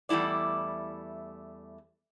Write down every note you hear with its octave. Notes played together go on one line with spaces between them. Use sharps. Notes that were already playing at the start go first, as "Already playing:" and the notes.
E2 G3 A3 E4 D5